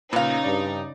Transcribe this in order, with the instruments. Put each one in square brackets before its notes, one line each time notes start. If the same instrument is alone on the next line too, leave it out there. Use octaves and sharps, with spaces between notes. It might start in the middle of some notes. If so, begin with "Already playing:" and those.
[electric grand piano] A#2 [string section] C#3 D#4 [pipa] B4 F5
[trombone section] G2 [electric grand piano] D5